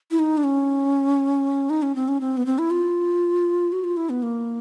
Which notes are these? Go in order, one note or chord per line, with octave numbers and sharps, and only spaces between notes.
E4
D#4
D4
C#4
D#4
C#4
C4
C#4
C4
B3
C4
E4
F4
F#4
F4
E4
B3
A#3